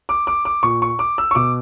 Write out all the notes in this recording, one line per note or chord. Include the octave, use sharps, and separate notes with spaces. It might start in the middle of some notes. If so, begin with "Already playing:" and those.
D6
D6
D6
A#2 C#6
C#6
D6
E6
C#6
B2 D6